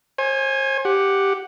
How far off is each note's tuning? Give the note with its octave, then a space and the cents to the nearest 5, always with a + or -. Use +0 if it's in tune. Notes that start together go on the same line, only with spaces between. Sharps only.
C5 +45 G#5 +0
G4 +0 F#5 +0